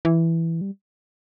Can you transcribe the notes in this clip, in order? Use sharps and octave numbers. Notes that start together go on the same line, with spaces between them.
E3
G3